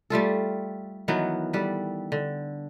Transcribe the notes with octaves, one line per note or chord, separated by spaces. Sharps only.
G3 A3 F4 A4
D#3 E3 F#3 B3
G3 A4 B4
D3